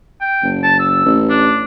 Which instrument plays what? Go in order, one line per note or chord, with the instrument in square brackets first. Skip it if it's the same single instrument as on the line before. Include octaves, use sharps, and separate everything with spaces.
[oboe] G5
[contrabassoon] F#1
[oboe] A5
E6
[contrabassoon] A1
[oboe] D4